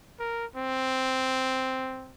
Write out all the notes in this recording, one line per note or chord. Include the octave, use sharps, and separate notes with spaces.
A#4
C4